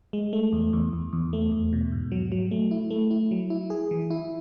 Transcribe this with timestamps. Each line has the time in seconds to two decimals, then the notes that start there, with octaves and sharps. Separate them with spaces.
0.13 G#3
0.33 A3
0.53 E2
0.73 E2
0.93 E2
1.13 E2
1.33 A3
1.52 E2
1.73 B2
1.92 G#2
2.12 F#3
2.32 F#3
2.51 A3
2.71 E4
2.91 A3
3.11 E4
3.31 F#3
3.50 E4
3.70 G#4
3.91 E3
4.10 E4